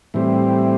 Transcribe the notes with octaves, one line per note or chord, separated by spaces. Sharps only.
A2 E3 G3 C4